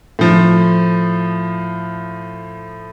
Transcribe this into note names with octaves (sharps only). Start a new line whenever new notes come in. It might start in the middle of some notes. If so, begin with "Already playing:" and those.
A2 F3